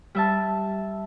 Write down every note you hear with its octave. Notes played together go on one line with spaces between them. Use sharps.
G3 E5 A5